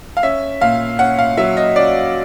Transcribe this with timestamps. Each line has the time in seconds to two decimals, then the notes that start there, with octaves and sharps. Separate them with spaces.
0.17 F5
0.23 C#4 E5
0.61 A#2 F5
0.99 C#4 F#5
1.19 F5
1.37 F#3 E5
1.57 D#5
1.76 C#4 D5